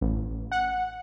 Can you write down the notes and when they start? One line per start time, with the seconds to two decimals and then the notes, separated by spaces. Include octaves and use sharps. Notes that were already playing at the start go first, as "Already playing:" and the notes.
0.01 A1
0.52 F#5